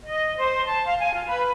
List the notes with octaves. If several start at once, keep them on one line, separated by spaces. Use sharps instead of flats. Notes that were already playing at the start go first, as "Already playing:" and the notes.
D#5
C5
A5
F5
G#5
F4
B4